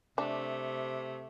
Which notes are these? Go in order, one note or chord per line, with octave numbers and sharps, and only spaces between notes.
C3 A3 D4